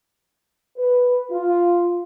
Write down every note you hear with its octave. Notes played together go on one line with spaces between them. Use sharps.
B4
F4